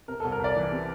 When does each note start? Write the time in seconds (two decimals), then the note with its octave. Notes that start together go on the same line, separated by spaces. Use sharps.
0.08 C3 A#4
0.20 C2 A4
0.32 A#4
0.40 C2 D5
0.56 E3
0.72 C3